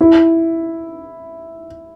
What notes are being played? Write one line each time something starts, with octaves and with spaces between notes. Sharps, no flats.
E4